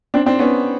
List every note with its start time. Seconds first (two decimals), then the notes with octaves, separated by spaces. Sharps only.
0.14 C4 D4
0.26 C4 D4
0.39 B3 C#4